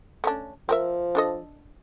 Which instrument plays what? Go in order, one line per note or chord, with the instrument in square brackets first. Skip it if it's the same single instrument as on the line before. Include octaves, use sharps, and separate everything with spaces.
[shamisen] A3 C#4 D4
[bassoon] F3 [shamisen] C4 A#4 E5
[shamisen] D4 A4 D#5